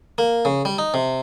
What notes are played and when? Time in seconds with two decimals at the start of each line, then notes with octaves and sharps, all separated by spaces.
0.18 A#3
0.45 C#3
0.65 G3
0.78 D#4
0.94 C3